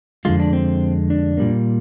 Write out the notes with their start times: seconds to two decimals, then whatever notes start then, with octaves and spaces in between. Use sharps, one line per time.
0.25 F2 D3 G#3 F4
0.40 D4
0.53 C4
1.10 D4
1.37 A#2 G3 A#3